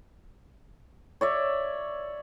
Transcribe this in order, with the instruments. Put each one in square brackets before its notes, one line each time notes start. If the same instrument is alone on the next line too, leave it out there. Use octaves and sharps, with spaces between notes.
[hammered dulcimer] C#5 D5 E5